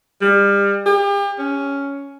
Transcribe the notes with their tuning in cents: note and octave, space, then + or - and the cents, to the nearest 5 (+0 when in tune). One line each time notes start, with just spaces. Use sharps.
G3 +30
G4 +40
C#4 +10